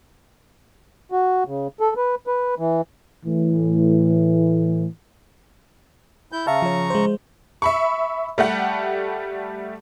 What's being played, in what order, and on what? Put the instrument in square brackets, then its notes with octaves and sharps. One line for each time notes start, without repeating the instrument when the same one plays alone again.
[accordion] F#4
C#3
A4
B4
B4
E3
[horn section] A2 E3
[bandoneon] E4 G6
[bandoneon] C#3 A#5 C#6 [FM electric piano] E5 F5 A5
[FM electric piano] F3 C#5
G#3 C5
[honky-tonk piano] E5 B5 C#6
G3 A3 G4 F#5